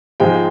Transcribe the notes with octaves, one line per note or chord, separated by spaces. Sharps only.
G#2 F3 G#3 G5